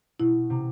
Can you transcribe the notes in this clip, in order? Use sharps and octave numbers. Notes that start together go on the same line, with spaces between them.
B2 E4
C3